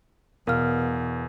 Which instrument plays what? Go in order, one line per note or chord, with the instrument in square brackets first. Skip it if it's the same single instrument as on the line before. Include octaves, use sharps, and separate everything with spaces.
[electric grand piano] E2 [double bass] B2 [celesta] A#4 F5 F6